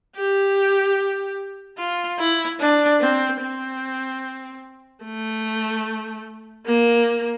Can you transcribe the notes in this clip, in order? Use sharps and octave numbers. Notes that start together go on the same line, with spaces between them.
G4
F4
E4
D4
C4
C4
A3
A#3